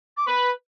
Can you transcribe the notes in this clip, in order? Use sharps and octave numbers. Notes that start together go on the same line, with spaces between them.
D6
B4 B5